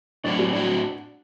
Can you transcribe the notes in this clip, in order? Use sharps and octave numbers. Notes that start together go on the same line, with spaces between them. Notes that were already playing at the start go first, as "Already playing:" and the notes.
A2 F#3 C4 D4 F#4 D5
G3 G4
A2 F#3 C4 D4 F#4